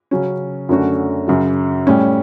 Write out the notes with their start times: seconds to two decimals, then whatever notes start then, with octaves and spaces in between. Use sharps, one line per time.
0.11 C#3 F#3 C#4
0.69 F#2 D3 A3 C#4 F#4
1.28 F#2 C#3 F#3
1.87 A2 G3 C#4